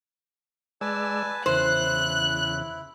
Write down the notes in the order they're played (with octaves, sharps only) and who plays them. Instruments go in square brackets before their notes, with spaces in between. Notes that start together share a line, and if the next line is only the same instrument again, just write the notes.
[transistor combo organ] G#3 D5 E6 [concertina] B4 G#5 A5
[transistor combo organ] E2 C#3 [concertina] E4 [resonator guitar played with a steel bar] C5 [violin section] F#6